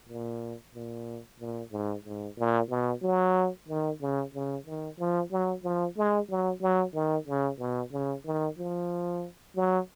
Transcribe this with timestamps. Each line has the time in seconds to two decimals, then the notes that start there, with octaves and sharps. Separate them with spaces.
0.09 A#2
0.75 A#2
1.40 A#2
1.72 G#2
2.05 G#2
2.38 A#2
2.70 B2
3.02 F#3
3.68 D#3
4.01 C#3
4.34 C#3
4.66 D#3
4.99 F3
5.31 F#3
5.63 F3
5.97 G#3
6.29 F#3
6.61 F#3
6.94 D#3
7.27 C#3
7.59 B2
7.92 C#3
8.25 D#3
8.58 F3
9.56 F#3